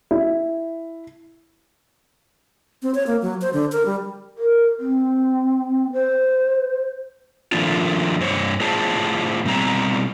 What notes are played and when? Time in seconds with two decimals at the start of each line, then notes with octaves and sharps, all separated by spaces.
0.11 E4
2.83 C4
2.95 C#5
3.07 A#3
3.22 F#3
3.42 C5
3.53 D3
3.72 A#4
3.86 G3
4.38 A#4
4.79 C4
5.93 C5
7.52 D#3 F3 A3 A#3 D4 F4
8.20 G2 C5 C#5
8.61 A2 F4 G#4 C5 A5
9.45 B2 G3 C4 A#5